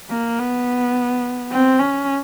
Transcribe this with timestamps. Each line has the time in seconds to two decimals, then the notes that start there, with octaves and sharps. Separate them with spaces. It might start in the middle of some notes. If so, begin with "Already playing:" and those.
0.10 A#3
0.39 B3
1.51 C4
1.79 C#4